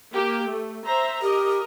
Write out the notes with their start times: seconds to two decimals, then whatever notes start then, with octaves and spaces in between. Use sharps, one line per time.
0.13 A#3 G4
0.48 A3
0.84 C5 E5 A#5
1.22 G4 A#4 D#5